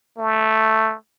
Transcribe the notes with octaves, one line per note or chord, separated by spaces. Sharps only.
A3